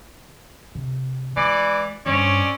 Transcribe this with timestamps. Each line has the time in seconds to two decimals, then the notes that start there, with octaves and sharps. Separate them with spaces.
0.75 C3
1.36 E3 G#3 D5
2.06 G2 C4 C#4 C#5 D5